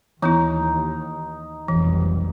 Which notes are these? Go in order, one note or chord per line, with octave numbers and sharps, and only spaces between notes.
D#2 E3 B3 D#4 E4
F1 B1 E3 G3